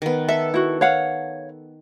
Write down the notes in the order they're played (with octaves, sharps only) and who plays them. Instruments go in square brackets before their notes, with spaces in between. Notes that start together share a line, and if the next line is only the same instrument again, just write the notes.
[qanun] D#3 B3
[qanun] A4 [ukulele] E5
[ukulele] E4 F#4
C#5 F5 F#5